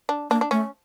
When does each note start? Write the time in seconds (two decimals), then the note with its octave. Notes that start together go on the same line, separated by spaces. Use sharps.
0.09 D4
0.30 A#3 D4
0.41 D4
0.51 A3 C#4